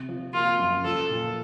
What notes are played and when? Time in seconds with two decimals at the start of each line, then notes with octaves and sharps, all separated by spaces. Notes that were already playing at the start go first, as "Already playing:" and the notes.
Already playing: C3
0.09 F3
0.34 A#3 F4
0.59 F#2
0.85 F3 A4
1.10 A#2